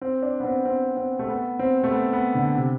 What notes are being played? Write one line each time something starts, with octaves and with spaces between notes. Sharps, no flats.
C4
D4
B3
C4
C4
C4
A3
B3
C4
A3
B3
B3
D3
C3